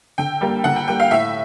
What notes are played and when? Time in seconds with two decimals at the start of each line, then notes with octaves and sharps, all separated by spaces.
0.18 D3 G5
0.41 G3 A#3
0.64 D3 F#5
0.76 G5
0.88 G3 A#3 G5
1.00 F5
1.11 A2 E5